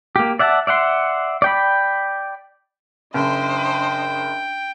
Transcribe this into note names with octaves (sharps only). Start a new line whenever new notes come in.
A#3 G4
D5 E5 F#5 G#5 A5
D5 E5 F#5 C6
D5 G5 B5
F#1 D4 C5 D#5 G5